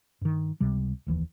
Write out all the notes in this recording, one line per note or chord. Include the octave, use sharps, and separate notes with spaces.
G2 D#3
C#2 C3 G3
F1 D#2 E3